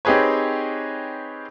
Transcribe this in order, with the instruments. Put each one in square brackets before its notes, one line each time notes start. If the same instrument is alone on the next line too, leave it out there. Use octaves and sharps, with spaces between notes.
[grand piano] C4 D#4 G4 G#4 B4 C#5